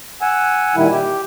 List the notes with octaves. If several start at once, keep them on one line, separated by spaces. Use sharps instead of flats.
F#5 G#5 E6
A#2 D#3 G3 E4
G4